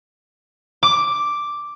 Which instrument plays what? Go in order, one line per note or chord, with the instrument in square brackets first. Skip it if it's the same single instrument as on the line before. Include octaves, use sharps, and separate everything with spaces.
[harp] D6